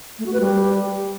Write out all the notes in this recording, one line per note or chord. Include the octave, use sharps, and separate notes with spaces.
A3
F#4
B4
G3